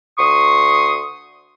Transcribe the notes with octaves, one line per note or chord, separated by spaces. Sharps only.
D2 C6 C#6 D#6